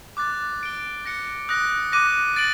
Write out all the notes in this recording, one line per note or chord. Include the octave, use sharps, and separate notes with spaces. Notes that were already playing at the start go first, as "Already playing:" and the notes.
D6 F#6 A6
A6 D7 G7
F#6 A#6 C#7
D#6 F#6 A#6
D6 F#6 A#6 D#7
A6 D7 F#7